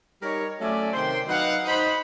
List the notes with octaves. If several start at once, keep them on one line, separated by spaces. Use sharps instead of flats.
G3 D#4 A#4 C#5
F#3 A3 C#4 D5 E5 G#5
C3 D#3 C5 G5 C6
F#3 D#4 B4 F5 F#5
D#4 C5 B5